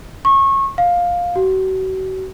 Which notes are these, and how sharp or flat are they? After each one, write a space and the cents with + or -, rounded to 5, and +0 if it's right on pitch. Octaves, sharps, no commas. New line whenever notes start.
C#6 -25
F5 +10
F#4 +35